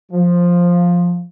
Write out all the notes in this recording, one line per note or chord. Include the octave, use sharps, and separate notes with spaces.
F3